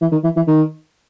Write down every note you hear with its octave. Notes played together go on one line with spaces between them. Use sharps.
E3
D#3
E3
E3
D#3